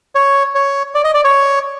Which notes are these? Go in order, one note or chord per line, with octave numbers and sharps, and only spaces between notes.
C#5
C#5
D5
D#5
D5
C#5